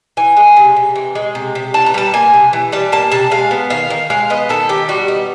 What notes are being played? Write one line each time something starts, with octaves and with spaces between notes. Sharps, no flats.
E3 G#5
G#3
C3
C3
E3
G#3
C3
C3
E3 A5
A#5
G3 A5
A#3 G#5
C3
E3
G3 A5
A#3 A5
C3 A5
G#3 F5
B3
D#3 F5
D#3
G#3 F5
B3 D#5
D#3 A4
D#3 G4
G3 F#4
B3 D#4